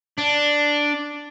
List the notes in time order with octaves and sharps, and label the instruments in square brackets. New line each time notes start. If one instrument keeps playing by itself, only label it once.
[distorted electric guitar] D4